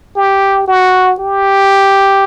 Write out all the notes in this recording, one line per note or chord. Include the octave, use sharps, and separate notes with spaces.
G4
F#4
G4